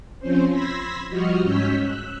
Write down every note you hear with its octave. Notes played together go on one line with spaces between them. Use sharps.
F3 C4 C#4 C5
B5 C6 E6 G#6 A#6 B6
F3 G3 F#4 D#5 C#6 F6
G#2 C#4 C#5 E6 G6 B6
E6 F#6